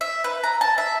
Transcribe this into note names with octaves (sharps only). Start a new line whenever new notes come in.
E5
B4
A#5
A5
E5